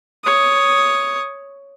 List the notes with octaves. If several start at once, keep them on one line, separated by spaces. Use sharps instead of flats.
C#5 D#6